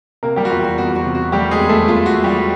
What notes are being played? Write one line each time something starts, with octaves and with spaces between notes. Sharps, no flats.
C3 A#3 A#4
G3 G4
F#4
E2 F4
F#4
E2 F#4
F#4
C3
F#4
G3 A3 G4
G#3 G#4
E2
A3 A4
E2 F4
F#4
A3
G3 G4